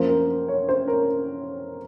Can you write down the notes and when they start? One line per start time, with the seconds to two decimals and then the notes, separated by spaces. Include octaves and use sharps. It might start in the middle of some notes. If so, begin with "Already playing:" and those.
Already playing: F#2 F3 A#3 C5
0.09 A#4
0.48 C#5
0.69 C5
0.88 A#4